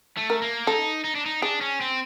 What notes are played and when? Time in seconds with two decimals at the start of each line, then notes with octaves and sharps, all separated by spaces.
0.17 A3
0.30 A#4
0.42 A#3
0.67 D#4 A4
1.04 D#4
1.15 D4
1.26 D#4
1.42 D4 G#4
1.61 C#4
1.81 C4